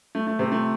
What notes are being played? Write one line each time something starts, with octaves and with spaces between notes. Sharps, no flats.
A3
A3
C3 C4
A3